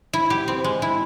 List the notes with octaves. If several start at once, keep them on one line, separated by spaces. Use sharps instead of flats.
E4
G4
C4
G#3
E4